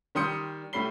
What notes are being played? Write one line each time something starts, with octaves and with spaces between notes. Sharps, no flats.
D#3 G3 C6 D#6 G6 C#7
A2 G3 B5 C7 G7